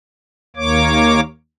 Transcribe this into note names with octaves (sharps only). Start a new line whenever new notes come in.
D#2 A#3 C#5 D6